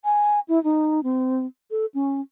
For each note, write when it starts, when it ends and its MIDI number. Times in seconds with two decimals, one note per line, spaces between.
0.04 0.40 80
0.49 0.62 64
0.64 1.03 63
1.03 1.46 60
1.71 1.86 69
1.94 2.21 61